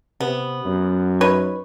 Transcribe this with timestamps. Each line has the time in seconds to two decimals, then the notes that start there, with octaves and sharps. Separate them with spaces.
0.21 C3 B3
0.65 F#2
1.21 D#4 B4 C#5